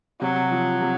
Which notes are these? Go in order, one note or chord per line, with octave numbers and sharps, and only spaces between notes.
C3 F#3
F3
C3